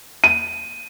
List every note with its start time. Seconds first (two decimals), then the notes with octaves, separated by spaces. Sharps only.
0.24 D#7